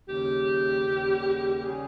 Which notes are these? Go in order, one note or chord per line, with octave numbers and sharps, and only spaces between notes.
D#2 C#3 G3 G4
D#2 C#3 G3
C#3 G3 G#4